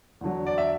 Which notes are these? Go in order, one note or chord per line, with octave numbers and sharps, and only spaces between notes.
E2 D3 F#3
D5
E5